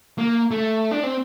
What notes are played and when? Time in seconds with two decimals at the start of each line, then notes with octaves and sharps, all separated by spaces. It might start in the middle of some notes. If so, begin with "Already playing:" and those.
0.18 A#3
0.51 A3
0.91 D4
1.03 C4